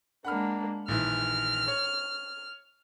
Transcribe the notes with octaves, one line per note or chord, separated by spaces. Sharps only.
G#3 A#3 D4 F#5 B5 F6
A#1 D#3 E3 F6
C#5